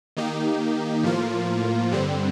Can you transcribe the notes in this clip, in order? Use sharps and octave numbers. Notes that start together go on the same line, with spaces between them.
D#3 A#3 D#4 G4
A2 F3 A#3 F4
G2 D3 G3 C4